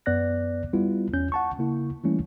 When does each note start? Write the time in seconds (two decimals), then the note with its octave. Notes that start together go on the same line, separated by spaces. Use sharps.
0.06 F#2 B3 D5 F#6 A#6
0.73 G3 B3 E4 F4
1.13 E2 C#4 G6
1.32 F#5 A5 C#6
1.59 C#3 A#3 E4
2.04 E3 G3 A3 A#3 C#4 E4